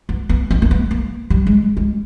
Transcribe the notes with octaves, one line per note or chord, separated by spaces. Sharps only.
B3
B3
C4
A#3
B3
A#3
G3
G#3
G#3